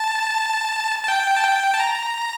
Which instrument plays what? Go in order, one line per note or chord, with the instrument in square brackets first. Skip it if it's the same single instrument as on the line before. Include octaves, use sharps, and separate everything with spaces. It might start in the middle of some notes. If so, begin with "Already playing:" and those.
Already playing: [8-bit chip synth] A5
A5
G5
A5
G5
A5
A#5